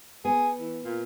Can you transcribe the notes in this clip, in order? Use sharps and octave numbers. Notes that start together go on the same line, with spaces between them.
B3 G#4
E3
A#2